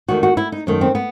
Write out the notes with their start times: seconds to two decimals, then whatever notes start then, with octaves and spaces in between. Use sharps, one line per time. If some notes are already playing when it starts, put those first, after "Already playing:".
0.08 E2 D#3 A3 F#4
0.23 F#4
0.37 E4
0.52 D#4
0.67 F#2 D#3 A3
0.81 C4
0.95 B3